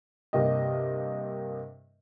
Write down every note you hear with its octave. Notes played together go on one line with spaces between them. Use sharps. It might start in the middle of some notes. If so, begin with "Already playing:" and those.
G2 C3 A#3 G4 D#5